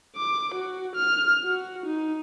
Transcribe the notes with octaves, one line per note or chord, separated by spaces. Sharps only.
D6
F#4
F6
F#4
D#4